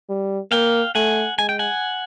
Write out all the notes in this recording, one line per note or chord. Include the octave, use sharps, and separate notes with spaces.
G3
A#3 F5 G5
A3 F#5 G#5
G#3 G#5
G5
F#5 G#5